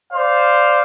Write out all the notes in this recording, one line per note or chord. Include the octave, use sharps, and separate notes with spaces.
C5 D5 F5